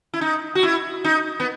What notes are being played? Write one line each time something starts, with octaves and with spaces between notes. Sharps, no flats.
E4
D#4
F#4
E4
D#4
B3